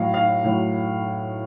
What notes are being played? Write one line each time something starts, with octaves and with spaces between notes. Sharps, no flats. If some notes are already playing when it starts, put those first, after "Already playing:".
Already playing: A2 F#3 F5
F5
A2 F#3